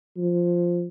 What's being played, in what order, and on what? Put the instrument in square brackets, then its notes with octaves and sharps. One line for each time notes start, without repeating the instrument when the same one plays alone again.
[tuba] F3